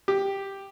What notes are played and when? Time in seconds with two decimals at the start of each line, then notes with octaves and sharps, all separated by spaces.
0.08 G4